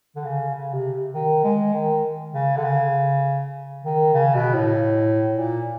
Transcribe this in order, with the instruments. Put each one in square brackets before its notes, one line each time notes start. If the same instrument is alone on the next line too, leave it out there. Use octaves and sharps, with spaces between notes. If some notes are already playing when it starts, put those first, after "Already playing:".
[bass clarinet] D3
C#3
C#3
C3
D#3
G#3
D#3
C#3
D3
C#3
D#3
C#3
B2
A2
A#2